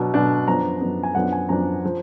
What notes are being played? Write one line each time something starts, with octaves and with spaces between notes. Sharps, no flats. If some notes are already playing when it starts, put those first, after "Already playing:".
Already playing: B2 F#3 D4
B2 F#3 D4
F#2 F3 B3 D4 A#5
F#2 F3 B3 D4
G#5
F#2 F3 B3 D4 F#5
G#5
F#2 F3 B3 D4 A#5
F3